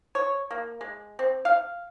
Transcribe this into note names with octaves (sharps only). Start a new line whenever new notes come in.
C#5
A#3
G#3
C4
F5